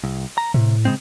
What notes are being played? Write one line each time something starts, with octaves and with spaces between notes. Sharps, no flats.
C2
A#5
A2 C3
C#3 G#3 C4